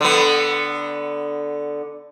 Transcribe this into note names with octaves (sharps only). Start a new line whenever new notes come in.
D3 B3